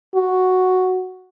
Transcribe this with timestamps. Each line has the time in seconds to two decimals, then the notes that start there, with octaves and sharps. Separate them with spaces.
0.15 F#4